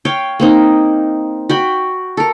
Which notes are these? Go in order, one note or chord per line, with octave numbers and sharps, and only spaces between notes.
C#5 F5 G5
A#3 C4 D#4
F#4 G5 B5
A4 A#4